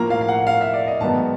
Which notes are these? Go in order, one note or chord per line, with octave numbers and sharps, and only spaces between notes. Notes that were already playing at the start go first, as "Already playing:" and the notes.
Already playing: A2 F3 A#3 A#5
F5
F5
F#5
F5
E5
D5
D#5
G#2 D#3 F#3 B3 A5